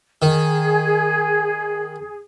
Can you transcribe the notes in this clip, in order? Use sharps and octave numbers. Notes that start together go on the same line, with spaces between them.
D#3 G#4